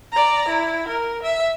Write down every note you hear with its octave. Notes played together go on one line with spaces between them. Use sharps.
D5 A#5
E4
A#4
E5